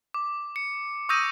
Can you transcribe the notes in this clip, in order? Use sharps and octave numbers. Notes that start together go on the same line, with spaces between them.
D6
C#7
C#6 D#6 E6 G6 A#6 D#7